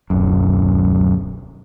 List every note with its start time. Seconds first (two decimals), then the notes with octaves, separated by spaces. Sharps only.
0.10 D1 B1 F#2